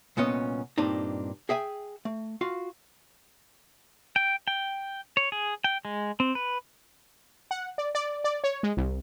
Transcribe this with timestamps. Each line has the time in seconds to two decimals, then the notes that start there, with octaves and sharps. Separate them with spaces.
0.17 C2 A#2 B3 C#4 D#5
0.78 G2 A#2 C4 D4 D#4
1.49 G#4 E5 G5 G#5
2.05 A3
2.41 F4 F#4 F5
4.16 G5
4.47 G5
5.17 C#5
5.32 G#4
5.64 G5
5.85 G#3
6.20 C4
6.35 B4
7.51 F#5
7.78 D5
7.95 D5
8.24 D5
8.44 C#5
8.63 G#3
8.77 C2